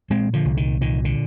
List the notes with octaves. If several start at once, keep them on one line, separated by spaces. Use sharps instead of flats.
A#2 G#3 C4
D3 F3
C2
D#3
A#2 D#3
D3